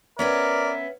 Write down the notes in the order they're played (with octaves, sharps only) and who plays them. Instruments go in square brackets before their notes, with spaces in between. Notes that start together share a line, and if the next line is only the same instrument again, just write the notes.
[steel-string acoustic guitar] B3 C#4 B4 [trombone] A#4 [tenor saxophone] D5 [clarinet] E5